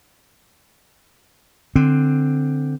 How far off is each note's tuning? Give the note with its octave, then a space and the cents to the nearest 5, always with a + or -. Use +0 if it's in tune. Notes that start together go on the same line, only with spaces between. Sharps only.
D3 +10 C4 +0